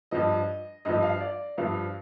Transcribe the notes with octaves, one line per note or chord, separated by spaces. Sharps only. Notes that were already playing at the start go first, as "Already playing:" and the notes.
G2 F3 D#5
G2 F3 D#5
F5
D5
G2 F3 F5